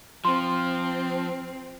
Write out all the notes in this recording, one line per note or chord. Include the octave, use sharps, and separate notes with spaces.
F3 C4 C6